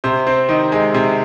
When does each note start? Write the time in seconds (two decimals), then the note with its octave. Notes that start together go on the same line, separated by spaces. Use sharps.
0.04 C3 C5
0.27 C4
0.49 D#3
0.72 G#3
0.94 C3